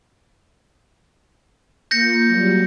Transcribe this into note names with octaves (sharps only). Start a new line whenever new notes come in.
A#3 F4 G6 A#6 C#7
F#3 G3